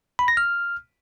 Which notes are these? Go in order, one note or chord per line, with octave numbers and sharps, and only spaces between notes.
B5
A#6
F6